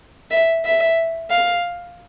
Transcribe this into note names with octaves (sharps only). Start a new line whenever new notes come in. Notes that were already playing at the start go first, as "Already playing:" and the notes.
E5
E5
F5